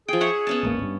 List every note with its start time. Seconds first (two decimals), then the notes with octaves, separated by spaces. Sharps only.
0.08 F3 G#4 G5
0.21 C#5 E5 F#5
0.47 B3 C#4 A5
0.63 D1 G#1 A#3
0.83 G2